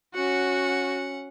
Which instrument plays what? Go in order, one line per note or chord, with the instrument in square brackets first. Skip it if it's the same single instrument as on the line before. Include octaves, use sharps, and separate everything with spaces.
[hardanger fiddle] C#4 F#5 [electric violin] F#4